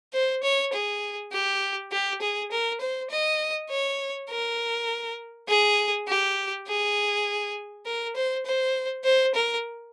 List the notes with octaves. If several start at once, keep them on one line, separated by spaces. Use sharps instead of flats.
C5
C#5
G#4
G4
G4
G#4
A#4
C5
D#5
C#5
A#4
G#4
G4
G#4
A#4
C5
C5
C5
A#4